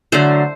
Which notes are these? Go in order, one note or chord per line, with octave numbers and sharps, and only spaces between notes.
D3 F#3 A3 C5